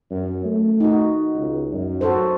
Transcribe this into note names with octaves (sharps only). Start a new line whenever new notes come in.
F#2
A3
D#4 F#4
C#2
F#2
F#4 A4 C5